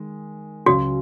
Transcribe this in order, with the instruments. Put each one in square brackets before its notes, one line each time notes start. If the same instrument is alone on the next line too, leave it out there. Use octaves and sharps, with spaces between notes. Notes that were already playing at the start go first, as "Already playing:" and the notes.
Already playing: [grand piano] D#3 G#3
[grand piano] C#2 C#3 F#3 [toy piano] F#4